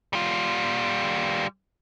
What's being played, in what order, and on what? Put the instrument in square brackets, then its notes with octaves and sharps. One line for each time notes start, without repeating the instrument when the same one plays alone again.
[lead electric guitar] G3 F4